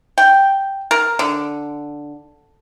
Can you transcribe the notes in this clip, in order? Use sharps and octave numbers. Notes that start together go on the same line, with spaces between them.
G5
A#4
D3